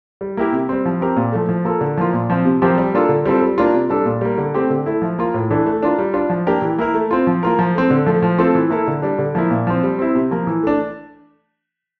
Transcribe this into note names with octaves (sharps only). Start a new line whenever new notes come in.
G3
A#3 E4 G4 A#4
C3
G3 C4
F3
C4 G4 A#4
A#2
F3 A3
F3
A#3 F4 A4
D3
F3 A#3 F4
A#2
F3 C4
C3
F3 C4 G4 A#4
G3
A#3 D4 F4 A4
D3
G3 C4 F4 A4
G3
A#3 D4 F4
C3
G3 D4 A4
A#2
G3 A#3
D3
A3 C4 G4
D3
A3 E4
F3
A#3 F4
A2
E3 A3 D4
A3
D4 F4 A#4
G3
D4 F4
F3
A#3 D4 G4 A#4
E3
A#3 E4 A#4
A3
C4 F4
F3
A#3 F4 A#4
F3
A3 C4
D3
F3 A3
F3
A3 C4 F4 A4
E3
A#3 E4 A4
D3
G3 D4
D3
F3 A#3 E4
A#2
F3 C4
G3
C4 E4
C3
F3 A#3
E3
A3 D4